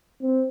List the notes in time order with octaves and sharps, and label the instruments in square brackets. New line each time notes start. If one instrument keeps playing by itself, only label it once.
[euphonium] C4